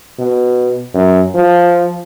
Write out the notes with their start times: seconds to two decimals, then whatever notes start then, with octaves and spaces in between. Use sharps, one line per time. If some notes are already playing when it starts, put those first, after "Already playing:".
0.19 B2
0.94 F#2
1.35 F3